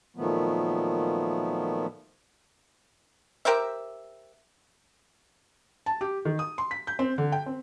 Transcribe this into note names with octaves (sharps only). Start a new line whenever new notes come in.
A#2 D#3 F3 F#3 A3 B3
G4 A#4 C5 E5
A5
G4
D#3
D#6
C6
B6
G6
C4
D3
G5
C4